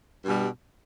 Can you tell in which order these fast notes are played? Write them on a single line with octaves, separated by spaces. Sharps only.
G2 B2 G3